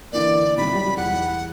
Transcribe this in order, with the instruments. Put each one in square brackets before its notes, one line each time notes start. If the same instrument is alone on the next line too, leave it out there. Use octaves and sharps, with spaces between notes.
[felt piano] D3 E3 A#3 [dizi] D5
[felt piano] C3 D#3 G3 [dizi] B5
[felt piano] F#3 G3
[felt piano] E2 [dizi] F#5